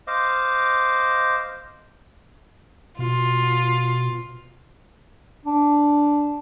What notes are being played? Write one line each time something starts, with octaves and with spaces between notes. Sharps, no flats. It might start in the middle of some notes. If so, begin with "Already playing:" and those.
C5 D#5 F5 D6
B2 F4
D4